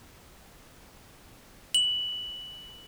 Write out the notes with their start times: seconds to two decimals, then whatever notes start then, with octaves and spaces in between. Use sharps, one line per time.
1.74 F#7